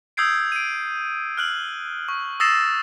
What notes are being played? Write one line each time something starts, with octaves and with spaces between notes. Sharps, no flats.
D#6 E6 G6 G#6 C7 D7
D7 D#7
F6 F#6 F#7
C#6
D#6 E6 A6 A#6 C7 E7